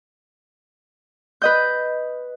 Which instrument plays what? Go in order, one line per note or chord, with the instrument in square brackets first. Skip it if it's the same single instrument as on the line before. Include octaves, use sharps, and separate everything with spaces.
[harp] B4 D#5 G6